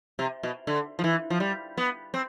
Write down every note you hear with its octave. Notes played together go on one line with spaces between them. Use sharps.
C3
B2
D3
F3
E3
F3
G3
B3
C4